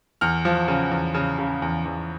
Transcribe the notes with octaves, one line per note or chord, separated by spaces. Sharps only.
E2 F6
F3
C#3
E2
C#3
C#3
E2
E2